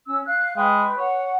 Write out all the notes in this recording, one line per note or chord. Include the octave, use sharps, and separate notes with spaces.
C#4 E6
F5 F#6
G#3 B4 G5
C#5 F#5